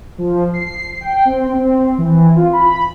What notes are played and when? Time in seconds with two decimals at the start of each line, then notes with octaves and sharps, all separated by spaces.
0.18 F3
0.54 C7
1.01 G5
1.25 C4
1.53 C4
1.98 E3
2.36 F4
2.53 B5